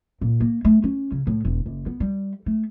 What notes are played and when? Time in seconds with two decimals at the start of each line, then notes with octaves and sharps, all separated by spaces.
0.21 A#2
0.40 A#3
0.65 A3
0.84 C#4
1.12 C#3
1.27 A2
1.45 E1
1.66 F#1
1.86 B3
2.00 G3
2.46 A3